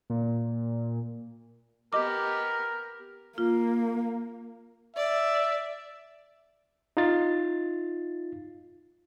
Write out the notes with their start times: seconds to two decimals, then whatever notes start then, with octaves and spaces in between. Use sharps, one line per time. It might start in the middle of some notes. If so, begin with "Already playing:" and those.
0.10 A#2
1.93 B3 G4 A#4 D#5 D6
3.38 A#3 F4
4.96 D5 E5
6.97 D#4 F4 A6